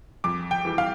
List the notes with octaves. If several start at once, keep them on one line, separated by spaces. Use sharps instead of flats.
F2 D6
G5
E3 G3
F5